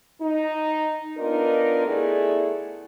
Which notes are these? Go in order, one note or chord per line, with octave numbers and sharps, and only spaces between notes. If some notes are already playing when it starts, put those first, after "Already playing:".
D#4
B3 D4 D#4 F4 A#4
E2 A3 B3 E4 G#4 D5